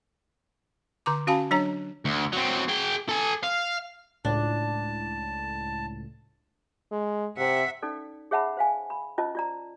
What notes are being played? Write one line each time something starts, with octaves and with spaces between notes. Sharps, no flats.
D3 A#5 D6
C#4 F#4 F5 G#5 A5 B5
F#3 D4 C#5 A#5
D2
F#3 C4
G#4 G5
A4 G#5
F5
C#2 A2 D4 A5
G#3
C3 E5 F#5
C#4 D#4 A4 D5
G#4 C#5 E5 F#5 A5 B5
C5 F5 G#5
B5
C#4 F4 C5 D#5 A5
F4 D5 A#5